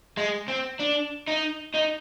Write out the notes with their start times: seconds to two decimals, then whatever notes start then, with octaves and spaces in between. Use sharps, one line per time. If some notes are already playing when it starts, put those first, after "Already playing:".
0.17 G#3
0.48 C4
0.80 D4
1.28 D#4
1.75 D#4